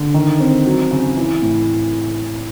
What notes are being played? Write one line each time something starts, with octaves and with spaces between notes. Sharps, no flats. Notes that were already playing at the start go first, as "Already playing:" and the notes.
Already playing: D3
D#3
C4
F#3
C#3
E3
A2